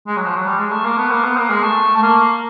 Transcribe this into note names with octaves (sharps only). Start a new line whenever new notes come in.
G#3
F#3
F3
F#3
G3
G#3
A3
A#3
B3
A#3
B3
A#3
G#3
A3
A3
A#3